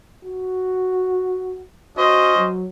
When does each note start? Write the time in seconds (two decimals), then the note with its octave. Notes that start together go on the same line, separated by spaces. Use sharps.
0.24 F#4
1.97 C#4 F#4 C5 D#5
2.35 F#3